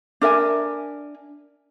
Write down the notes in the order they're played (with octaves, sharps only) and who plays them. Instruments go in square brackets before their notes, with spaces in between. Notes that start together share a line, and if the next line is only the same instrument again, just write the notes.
[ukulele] D4 A#4 E5 G#5